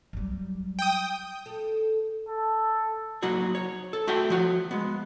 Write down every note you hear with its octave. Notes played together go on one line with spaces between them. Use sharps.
F#3 G3
G5 D#6
A4
A4
F#3 A#3 D#4 F#4 C#5
C#5
A4
A3 F#4 E5 G5
F3 F#4
G#3 B3